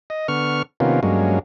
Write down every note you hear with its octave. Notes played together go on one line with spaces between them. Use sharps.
D#5
D3 B3 C#6 F6
C3 D#3 A#3 B3 C#4 F4
G2 F#3 G#3 A#3 C#4